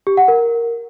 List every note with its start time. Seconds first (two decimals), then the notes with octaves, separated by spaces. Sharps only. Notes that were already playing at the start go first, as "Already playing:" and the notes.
0.07 G4
0.17 F#5
0.28 A#4